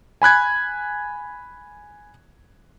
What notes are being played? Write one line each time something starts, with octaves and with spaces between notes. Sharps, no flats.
G#5 B5 F#6 G#6